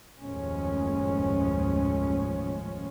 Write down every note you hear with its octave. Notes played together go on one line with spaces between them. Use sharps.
F#1 D#2 A2 F3 G#3 C#4